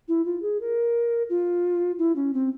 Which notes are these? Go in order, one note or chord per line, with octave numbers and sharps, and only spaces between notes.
E4
F4
G#4
A#4
F4
E4
C#4
C4